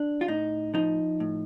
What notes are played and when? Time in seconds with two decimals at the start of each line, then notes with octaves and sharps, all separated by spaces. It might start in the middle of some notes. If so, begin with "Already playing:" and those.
Already playing: D4
0.21 F4
0.28 A2 D#4
0.74 F3 D#4
1.20 A2